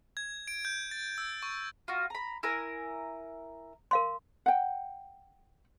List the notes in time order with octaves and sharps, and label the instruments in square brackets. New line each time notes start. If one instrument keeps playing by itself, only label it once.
[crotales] G#6
D7
G6
A6
E6
C#6
[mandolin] F4 F#4
A#5 B5
E4 A#4 G#5
[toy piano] A#4 F5 C6
[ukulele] F#5 G5